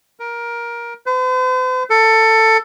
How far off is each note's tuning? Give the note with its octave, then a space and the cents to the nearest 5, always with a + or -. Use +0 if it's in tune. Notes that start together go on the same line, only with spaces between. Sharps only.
A#4 +15
C5 -45
A4 +15